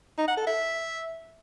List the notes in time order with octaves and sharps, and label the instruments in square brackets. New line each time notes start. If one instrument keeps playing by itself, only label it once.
[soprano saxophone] D#4
F#5
A4
E5